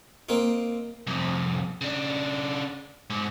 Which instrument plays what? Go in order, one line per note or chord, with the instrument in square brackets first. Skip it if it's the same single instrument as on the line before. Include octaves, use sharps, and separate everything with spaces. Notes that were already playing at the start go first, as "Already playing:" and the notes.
[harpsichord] A#3 C4 D#4
[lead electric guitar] C2 F2
C#3 D4
G#2